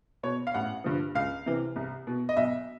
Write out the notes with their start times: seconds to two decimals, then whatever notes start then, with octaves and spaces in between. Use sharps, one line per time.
0.23 B2 C#5
0.47 F5
0.54 A1 F#5
0.84 G2 D3 F3
1.15 C#2 F5
1.46 C3 E3
1.76 C2
2.07 B2
2.29 D#5
2.36 B1 E5